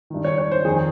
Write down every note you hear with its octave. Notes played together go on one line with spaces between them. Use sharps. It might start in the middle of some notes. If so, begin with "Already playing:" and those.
G2 D#3
C#5
C#5
C5
F2 D#3 G#4